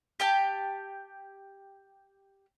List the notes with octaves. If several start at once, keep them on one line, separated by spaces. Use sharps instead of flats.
G4 G5 A5